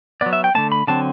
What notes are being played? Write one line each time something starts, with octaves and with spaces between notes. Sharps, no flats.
F#3 B3 D5
E5
G5
D3 A3 C4 A5
B5
D3 F#3 C4 A5